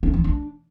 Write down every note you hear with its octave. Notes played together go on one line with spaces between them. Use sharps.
C#4
E3
D4